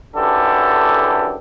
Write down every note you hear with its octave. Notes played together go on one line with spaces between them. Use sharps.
F#2 D3 E3 G4 A4